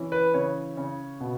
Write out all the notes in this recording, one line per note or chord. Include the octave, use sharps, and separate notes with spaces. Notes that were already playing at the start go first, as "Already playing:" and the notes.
Already playing: E3 C#4
B4
C#3 C#5
C#3
B2